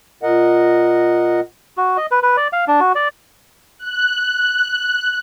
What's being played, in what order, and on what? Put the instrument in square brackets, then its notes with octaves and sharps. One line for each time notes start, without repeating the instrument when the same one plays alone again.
[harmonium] A#2 A#4 D#5 F#5
[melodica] F#4
D#5
B4
B4
D5
F5
D4
F#4
D5
[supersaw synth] F#6